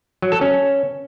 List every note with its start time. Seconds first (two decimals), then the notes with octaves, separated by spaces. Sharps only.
0.22 F#3
0.32 A4
0.41 C#4